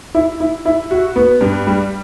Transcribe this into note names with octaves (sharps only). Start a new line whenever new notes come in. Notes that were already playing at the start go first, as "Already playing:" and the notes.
E4
E4
E4
F#4
B3
G2
G3